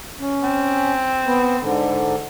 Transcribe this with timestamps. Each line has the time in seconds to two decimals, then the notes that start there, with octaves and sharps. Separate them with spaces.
0.20 C#4
0.43 C4
1.26 B3
1.61 G#2 D3